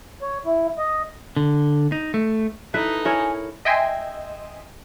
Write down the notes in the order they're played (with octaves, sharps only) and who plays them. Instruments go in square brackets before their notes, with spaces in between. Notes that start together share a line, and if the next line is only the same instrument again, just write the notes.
[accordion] C#5
E4
D#5
[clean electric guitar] D3
D#4
A3
[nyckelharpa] D#4 A4 [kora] E4 B4
[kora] E4 A#4 C#5 [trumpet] G#5
[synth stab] D#5 E5 G5 G#5 C6